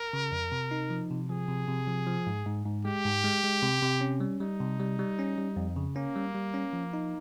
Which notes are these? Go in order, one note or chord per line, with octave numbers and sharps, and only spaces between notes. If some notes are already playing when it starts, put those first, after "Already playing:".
Already playing: A#4
C#3
F2
C3
D#4
F3
C3
F3 G#4
C3
C3
F3
F3
G#2
G#2
G#2
G#3 G4
G#2
G#3
G#3
C3
C3
C#4
G3
G3 D#4
C3
G3
G3
C#4
G3
F2
C#3
A#3 C#4
G3
G3
C#4
F3
D#4